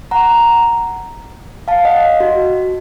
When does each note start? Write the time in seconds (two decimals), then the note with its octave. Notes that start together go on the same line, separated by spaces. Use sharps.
0.11 F#5 A#5
1.68 F5 A5
1.85 D#5 F#5
2.20 F#4